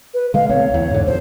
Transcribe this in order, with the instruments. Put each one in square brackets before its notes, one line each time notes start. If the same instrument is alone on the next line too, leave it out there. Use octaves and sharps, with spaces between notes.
[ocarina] B4
[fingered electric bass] D3 G#3 [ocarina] F5
[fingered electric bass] B1 A3 C4 [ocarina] C#5
[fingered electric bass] E2
G#2 D3
[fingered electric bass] B1 F2 [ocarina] C5